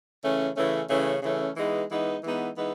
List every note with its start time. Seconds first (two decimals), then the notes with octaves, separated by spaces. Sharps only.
0.22 C#3 E3 A3 C#4
0.56 C#3 E3 A3 C#4
0.90 C#3 E3 A3 C#4
1.22 C#3 E3 A3 C#4
1.57 E3 G#3 B3 D#4
1.90 E3 G#3 B3 D#4
2.23 E3 G#3 B3 D#4
2.57 E3 G#3 B3 D#4